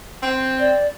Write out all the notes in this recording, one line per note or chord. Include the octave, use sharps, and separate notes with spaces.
C4
D5